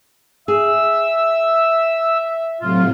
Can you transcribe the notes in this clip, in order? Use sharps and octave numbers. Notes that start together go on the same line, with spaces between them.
G#4 E5 E6
A2 C3 F#3 F4